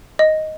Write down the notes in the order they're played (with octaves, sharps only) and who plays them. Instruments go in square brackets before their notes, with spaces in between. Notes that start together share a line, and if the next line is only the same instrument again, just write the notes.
[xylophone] D#5